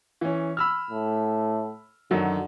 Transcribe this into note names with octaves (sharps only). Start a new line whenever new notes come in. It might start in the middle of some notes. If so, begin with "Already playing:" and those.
E3 C#4
B5 E6 F6
A2
F#2 D3 D#3 F#3